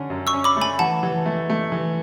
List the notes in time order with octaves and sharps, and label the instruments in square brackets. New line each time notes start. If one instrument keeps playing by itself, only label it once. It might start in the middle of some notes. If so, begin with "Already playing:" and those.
Already playing: [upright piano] D3 C#4
F#2
[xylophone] C#6 E6
[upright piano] C#4
[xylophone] B5 D6
[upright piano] A3
[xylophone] G#5 B5
[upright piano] E3 [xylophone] F#5 A5
[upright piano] E3
A3
A3
E3